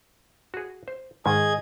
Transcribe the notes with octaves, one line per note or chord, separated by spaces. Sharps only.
F#4 G#4
C5
G#2 D#3 G#4 D#5 G#6